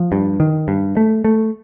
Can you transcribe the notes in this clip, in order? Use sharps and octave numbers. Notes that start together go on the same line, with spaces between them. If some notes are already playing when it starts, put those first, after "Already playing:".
Already playing: F3
G2
D#3
G2
A3
A3